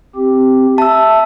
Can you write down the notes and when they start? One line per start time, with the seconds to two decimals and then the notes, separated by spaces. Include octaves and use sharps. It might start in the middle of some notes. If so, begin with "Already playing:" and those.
0.16 C4 G4
0.78 E5 A5 E6